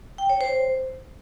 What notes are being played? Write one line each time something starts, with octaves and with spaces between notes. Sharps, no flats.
G5
C#5
C5